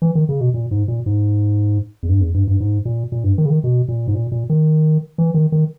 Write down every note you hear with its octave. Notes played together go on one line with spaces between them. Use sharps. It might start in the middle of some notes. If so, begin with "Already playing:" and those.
E3
D#3
C#3
B2
A#2
G#2
A#2
G#2
E2
G2
E2
G2
G2
G#2
A#2
A#2
G2
D#3
C#3
D#3
B2
A#2
G#2
A#2
A#2
D#3
E3
D#3
D#3